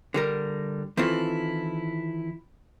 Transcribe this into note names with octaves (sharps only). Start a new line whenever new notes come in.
D3 G3 A#4
D#3 E3 C4 E4 F4 A4